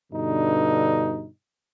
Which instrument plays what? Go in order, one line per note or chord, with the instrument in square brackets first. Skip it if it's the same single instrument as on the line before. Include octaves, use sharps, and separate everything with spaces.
[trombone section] G2 B2 D3 D#4